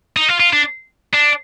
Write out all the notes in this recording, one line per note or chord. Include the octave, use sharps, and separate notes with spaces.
D#4
F4
F4
D4
D4